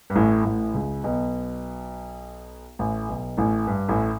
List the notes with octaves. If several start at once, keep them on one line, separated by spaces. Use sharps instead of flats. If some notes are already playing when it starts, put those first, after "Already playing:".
G2
A1 A2
A1 A2
C#2 C#3
B1 B2
A1 A2
B1 B2
A1 A2
G2
A1 A2